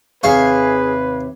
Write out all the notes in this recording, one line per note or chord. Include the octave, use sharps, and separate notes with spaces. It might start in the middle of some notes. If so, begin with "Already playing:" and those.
D#2 C3 G#4 B4 C#5 E5 F5